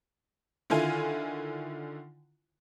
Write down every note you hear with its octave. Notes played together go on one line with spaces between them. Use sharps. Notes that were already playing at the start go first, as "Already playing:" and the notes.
D3 D#3 E4 F4 G#5